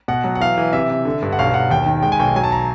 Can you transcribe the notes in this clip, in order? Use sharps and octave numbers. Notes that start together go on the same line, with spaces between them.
B2 F#5
F#3
F#5
E3 F5
E3
C3 E5
C3
D3
G2
F#5
B1 F5
B1 F#5
D#2 G5
D#3
G#3 G5
G#5
B1 G5
F#3 G#5
A5
A#5